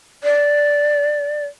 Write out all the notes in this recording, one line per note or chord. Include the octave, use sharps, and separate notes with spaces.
D5